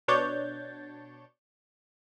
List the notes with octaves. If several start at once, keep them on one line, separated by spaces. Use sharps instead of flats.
B2 D4 C#5 G6 A6